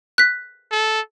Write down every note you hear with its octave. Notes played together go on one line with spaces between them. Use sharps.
F#6 B6
A4